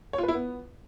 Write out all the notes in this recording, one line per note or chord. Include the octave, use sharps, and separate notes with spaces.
C#5
F4
B4
E4
B3